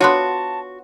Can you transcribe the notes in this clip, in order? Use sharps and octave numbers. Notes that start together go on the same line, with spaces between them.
B3 D4 F4 F#4 C#5 A5 C6